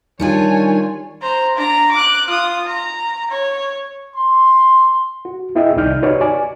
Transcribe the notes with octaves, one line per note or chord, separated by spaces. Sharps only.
D#3 G3 D4 F4 C#5 G#5
C5 A#5
D4 A#5
D6 F#6
F4 D#6
A#5
C#5
C6
F#4
B3 E4 G#4 D#5 E5 G5
C2 D#3 D#4 D5 F6 G6
D#4 F#4 G4 B4 C#5 D5
D5 G#5